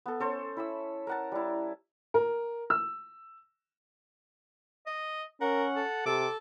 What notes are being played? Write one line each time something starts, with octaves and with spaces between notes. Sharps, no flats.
B3 A4
C#4 A4 C5 C#5
E4 B5 E6
A#4 F#5 A5
G3 E4
A#4
E6
D#5
C#4 A#4 F#5
A4
C3 A4 D6